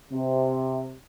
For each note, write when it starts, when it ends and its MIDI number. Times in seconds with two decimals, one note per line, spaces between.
0.11 0.92 48